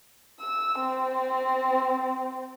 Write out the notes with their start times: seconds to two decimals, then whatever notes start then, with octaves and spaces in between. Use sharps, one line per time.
0.40 E6
0.79 C4